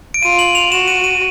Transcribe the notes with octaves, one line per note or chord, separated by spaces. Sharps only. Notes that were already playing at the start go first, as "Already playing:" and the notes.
D7
F4 D#7
F#7
F7
F#4 E7
D#7
D#7